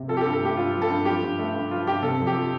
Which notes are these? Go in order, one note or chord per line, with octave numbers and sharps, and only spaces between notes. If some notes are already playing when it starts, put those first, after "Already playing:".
Already playing: C3
F3 A4
G4
A4
G2
A4
A3 G4
G2 F4
F3
A4
G2
F3 G4
G2
A3
G2
F3 F4
G2 G4
C3 A4
F2
G4
F3